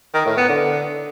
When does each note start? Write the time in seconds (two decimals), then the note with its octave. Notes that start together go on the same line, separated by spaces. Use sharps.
0.14 D#3
0.26 A2
0.37 B3
0.49 D3